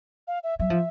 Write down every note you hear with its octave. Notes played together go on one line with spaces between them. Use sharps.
F5
E5
F#3 E5
F3